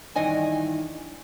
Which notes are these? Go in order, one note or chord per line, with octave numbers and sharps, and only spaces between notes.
G2 D#3 E3 D#5 G#5